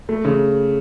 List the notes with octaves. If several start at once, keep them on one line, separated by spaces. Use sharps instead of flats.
A3
C#3